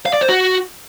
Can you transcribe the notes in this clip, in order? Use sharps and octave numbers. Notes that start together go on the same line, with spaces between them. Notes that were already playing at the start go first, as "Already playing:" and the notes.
F5
D5
C5
F#4